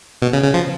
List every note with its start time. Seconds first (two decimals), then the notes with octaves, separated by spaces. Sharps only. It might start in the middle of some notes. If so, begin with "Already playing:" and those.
0.22 B2
0.33 C#3
0.43 C#3
0.54 F3